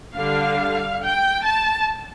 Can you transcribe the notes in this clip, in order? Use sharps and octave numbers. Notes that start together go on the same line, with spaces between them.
D3 G3 D4 F5
G5
A5